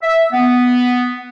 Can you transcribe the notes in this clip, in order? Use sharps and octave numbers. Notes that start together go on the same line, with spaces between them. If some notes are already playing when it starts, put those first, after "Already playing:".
E5
B3